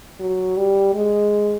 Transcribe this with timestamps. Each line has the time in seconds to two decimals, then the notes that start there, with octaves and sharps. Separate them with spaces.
0.20 F#3
0.57 G3
0.94 G#3